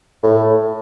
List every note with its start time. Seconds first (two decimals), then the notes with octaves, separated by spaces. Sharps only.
0.23 A2